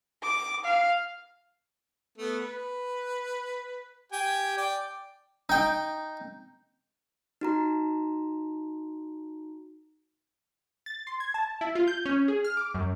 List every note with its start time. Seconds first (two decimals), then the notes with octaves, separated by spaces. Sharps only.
0.22 D6
0.64 F5
2.18 A3 B3
2.40 B4
4.12 G4 G5 G#5
4.57 D5 G5
5.49 D#4 G5
7.41 D#4 F#4 A#5
10.86 A6
11.07 C6
11.20 G#6
11.34 A5
11.61 E4
11.75 F4
11.88 G6
12.05 C#4
12.28 G#4
12.44 F6
12.57 D6
12.74 F#2